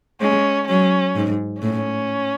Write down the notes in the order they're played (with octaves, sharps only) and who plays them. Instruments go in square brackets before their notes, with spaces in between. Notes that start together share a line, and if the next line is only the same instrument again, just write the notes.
[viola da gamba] G#3 [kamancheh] C#4
[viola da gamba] F#3 [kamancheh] C#4
[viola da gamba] G#2
[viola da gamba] A2 [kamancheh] C#4